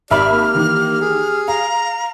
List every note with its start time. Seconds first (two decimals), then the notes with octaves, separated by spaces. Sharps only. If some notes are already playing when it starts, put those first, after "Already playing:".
0.11 G#1 G4 D5 E5 B5 F6
0.31 A#3
0.55 D#3 E3
1.01 G#4
1.48 F5 A#5